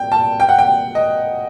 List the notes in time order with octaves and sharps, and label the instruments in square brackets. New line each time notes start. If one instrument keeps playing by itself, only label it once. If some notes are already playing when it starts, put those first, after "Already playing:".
Already playing: [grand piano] G5
A5
G5
F#5
G5
D#5